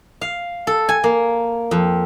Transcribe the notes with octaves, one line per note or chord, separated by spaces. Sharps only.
F5
A4
G#5
A#3
F2